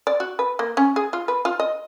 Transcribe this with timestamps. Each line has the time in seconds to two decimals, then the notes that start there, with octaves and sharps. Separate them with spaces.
0.07 D5
0.20 F#4
0.39 B4
0.59 A#3
0.77 C#4
0.96 G#4
1.13 F4
1.28 B4
1.45 F4
1.60 D#5